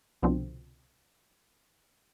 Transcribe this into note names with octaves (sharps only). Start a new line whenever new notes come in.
C2 B2 D3 F3 C4